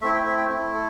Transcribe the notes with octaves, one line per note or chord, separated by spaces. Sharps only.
A3 C4 E4 E5
G5
E5
G5
A3 E4
A4